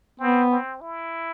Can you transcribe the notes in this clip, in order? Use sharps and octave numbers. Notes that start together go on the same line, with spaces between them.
B3 C4
C4
E4